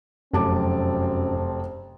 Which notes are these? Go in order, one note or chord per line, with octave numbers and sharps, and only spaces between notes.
F1 F#2 C4 A5 D6